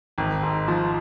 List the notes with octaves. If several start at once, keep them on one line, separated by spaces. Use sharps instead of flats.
G#1
G#2
F3